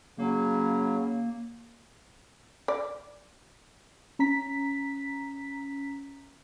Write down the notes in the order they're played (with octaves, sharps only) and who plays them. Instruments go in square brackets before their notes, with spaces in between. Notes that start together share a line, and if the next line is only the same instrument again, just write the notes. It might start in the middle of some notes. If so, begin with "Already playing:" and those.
[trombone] C#3 [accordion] F#3 [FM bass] A#3
[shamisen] D5
[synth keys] C#4 A#5 B6